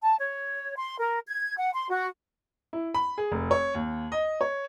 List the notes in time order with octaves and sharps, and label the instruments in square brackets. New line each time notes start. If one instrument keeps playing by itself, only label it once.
[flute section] A5
C#5
C6
A#4
G#6
F#5
C6
F#4
[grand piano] E4
B5
G#4
F1
C#5
D#2
D#5
C#5